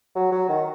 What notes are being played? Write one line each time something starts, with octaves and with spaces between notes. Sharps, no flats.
F#3
F#3
D#3